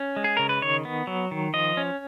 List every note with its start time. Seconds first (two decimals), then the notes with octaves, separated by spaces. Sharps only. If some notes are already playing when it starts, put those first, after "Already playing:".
Already playing: C#4
0.16 G#3
0.24 G#4
0.37 C#3 A#4
0.49 B4
0.62 D#3 C#5
0.85 B3
1.07 F#3
1.31 D#3
1.54 F3 D#5
1.77 C#4